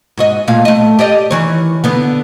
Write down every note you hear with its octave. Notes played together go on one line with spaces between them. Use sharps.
G#2 F#4 D#5
A#2 A3 F5
A3 D#5
G4 D5 D#5
D#3 E3 C#5
D3 B3